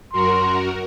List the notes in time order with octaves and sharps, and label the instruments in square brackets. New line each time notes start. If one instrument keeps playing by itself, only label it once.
[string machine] F#2 F#4 A#4 [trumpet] C6